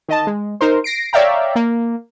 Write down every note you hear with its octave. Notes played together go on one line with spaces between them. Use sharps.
D#3 D#5 A5
G#3
D#4 A#4 C5
A#6 C7 D7
C#5 D5 E5 F5 G5 A#5
A#3